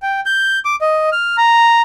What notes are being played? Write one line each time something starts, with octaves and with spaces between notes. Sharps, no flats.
G5
G6
D6
D#5
F6
A#5